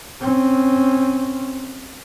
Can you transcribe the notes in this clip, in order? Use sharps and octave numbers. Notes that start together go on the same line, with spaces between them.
C4 C#4